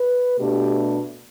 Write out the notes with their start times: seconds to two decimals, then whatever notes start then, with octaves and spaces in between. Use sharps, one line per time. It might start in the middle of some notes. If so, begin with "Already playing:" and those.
Already playing: B4
0.38 B2 A3 D4 G4